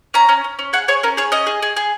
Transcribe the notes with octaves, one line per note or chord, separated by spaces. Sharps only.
C#4 A#5
C#4
C#4
C#4
G#4 F#5
G#4 C#5
C#4 A#4
G#4 C#5
C#4 D#5
G#4
G#4
G#4